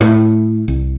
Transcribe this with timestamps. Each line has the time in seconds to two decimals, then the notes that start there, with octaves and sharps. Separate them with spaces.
0.01 A2
0.68 C2